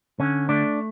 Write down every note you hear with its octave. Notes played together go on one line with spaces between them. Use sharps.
D3 C#4
A3 D4